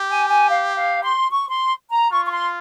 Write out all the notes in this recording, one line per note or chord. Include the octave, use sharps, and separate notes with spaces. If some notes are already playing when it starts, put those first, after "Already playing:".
Already playing: G4
G#5
G#5
F5
F5
C6
C#6
C6
A#5
F4 C#6
C#6
C6